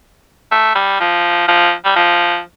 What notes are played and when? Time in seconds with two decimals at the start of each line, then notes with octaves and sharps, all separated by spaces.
0.52 A3
0.75 G3
1.00 F3
1.48 F3
1.85 G3
1.96 F3